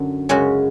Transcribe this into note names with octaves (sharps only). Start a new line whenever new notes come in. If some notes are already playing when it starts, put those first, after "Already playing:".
Already playing: F#2 D3 F#3
F#2 C#3 G#3 C#4 F#4